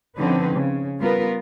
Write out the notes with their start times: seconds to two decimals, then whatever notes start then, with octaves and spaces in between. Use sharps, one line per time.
0.16 D3 F3 C4 C#4 D#4 B4
0.54 C#3
0.99 G3 B3 F4 A#4 B4